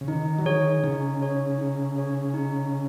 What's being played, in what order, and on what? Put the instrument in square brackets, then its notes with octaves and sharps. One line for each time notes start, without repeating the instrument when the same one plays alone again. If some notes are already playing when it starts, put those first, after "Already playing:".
[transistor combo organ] C#3
[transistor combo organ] D#3 [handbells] D#4
[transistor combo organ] F#3
[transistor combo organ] D#3 [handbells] G#4 C#5
[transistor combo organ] C#3 [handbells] D#4
[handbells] G#4 C#5
D#4
G#4 C#5
D#4